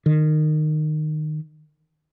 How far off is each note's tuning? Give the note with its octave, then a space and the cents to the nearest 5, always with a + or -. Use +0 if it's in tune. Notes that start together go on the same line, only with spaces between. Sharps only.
D#3 -20